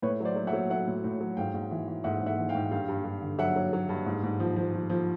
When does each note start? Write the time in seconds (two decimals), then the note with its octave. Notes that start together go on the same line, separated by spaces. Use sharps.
0.02 A2 B4 C#5
0.20 F#3 C5 D5
0.36 F#3
0.47 E5 F#5
0.53 F#3
0.70 F#3 E5 F#5
0.87 A2
1.04 A2
1.21 F#3
1.37 G#2 F5 G5
1.54 G#2
1.71 E3
1.88 E3
2.04 G#2 E5 F#5
2.21 G#2
2.26 E5 F#5
2.38 E3
2.49 F5 G5
2.55 G#2
2.71 G2 F5 G5
2.88 G2
3.05 G2
3.22 D3
3.39 F#3 E5 F#5
3.56 F#3
3.73 F#3
3.89 G2
4.06 G#2
4.23 G#2
4.40 F3
4.56 F3
4.73 F3
4.89 F3